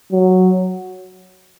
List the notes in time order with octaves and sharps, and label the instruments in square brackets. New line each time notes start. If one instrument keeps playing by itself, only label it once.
[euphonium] F#3